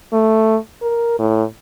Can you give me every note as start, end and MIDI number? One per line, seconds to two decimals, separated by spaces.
0.13 0.57 57
0.82 1.15 70
1.19 1.44 45